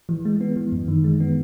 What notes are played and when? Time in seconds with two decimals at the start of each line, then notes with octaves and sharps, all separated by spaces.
0.09 E3
0.25 G#3
0.41 B3
0.56 E3
0.72 F#2
0.88 D#3
1.04 G#3
1.20 B3